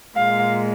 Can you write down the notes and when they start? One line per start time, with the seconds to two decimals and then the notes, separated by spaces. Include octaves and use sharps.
0.17 A#2 G#3 F5